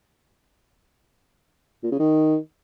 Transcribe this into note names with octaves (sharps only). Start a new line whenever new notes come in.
A#2
C#3
D#3